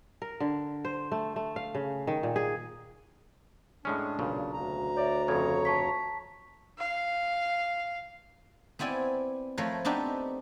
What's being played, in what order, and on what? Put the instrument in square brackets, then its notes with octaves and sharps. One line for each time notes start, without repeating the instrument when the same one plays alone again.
[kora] A#4
D3
C5
A3
A3
F5
C#3
D#3
A#2
G#4
[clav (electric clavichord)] A2 G#3 C#4 [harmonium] D4
[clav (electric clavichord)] B1 A#2 C#3
[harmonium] D2 A#5
[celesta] C#5 E5 [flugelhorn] D5
[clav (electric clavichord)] F2 C#3 [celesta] A4 G#6 [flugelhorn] C#5
[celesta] A5 C#6 B6
[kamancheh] F5
[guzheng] B3 C4 E4 D5 G#5
F3 A3 A#4 B4 C#5
B3 C4 D4 D#4 G4